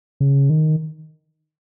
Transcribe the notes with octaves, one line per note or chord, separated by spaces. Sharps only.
C#3
D#3